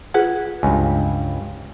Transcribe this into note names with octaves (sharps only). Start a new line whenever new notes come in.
F4 G#4 B4 F#5
C#2 G2 G#5